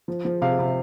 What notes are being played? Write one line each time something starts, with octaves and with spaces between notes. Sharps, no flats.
F3
F3
C3 F5
C3